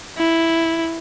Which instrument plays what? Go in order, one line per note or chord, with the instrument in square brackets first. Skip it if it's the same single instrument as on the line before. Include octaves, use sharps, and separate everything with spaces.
[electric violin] E4